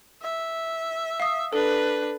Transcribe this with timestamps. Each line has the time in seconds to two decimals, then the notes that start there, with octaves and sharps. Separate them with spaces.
0.22 E5
1.20 F5 D#6
1.53 D4 A4 B4